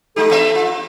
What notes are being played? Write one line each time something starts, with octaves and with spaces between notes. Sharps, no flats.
G#3 D#4 G4 A4
A3 B3 E5
F4